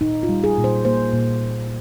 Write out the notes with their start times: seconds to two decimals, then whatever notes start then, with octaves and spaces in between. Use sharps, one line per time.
0.01 A#2 D#4
0.23 F4
0.29 G3
0.44 G#4
0.58 A#2
0.64 C5
0.85 A#3 C5
1.13 A#2